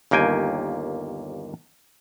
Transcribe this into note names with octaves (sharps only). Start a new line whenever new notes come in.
G1 D#2 A#3 G5 G#5